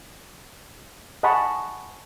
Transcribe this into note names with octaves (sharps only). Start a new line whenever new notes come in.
D#5 F#5 G#5 A5 B5 C#6